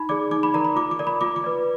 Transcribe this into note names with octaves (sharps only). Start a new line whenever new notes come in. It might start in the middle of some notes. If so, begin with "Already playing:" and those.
Already playing: D#4 B5
G#4 D5 D6
D#4 D6
B5
A#4 D5 A#5
B5
F4 D6
D6
A#4 D5
B5
F4 D6
D6
B4 D5